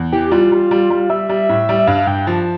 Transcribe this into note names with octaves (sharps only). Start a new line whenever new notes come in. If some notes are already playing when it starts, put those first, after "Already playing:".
Already playing: E2
E3 G4
G3 F4
G3
G3
G3
G3 E5
G3
A2
G3
E5
G2 F5
G2 G5
F3 A5